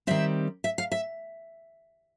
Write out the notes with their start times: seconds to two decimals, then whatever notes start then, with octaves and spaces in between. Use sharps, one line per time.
0.07 D#3 G3 C4 E5
0.64 E5
0.78 F5
0.92 E5